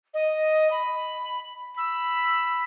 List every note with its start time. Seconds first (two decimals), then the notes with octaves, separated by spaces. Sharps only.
0.13 D#5
0.70 B5
1.77 B5 E6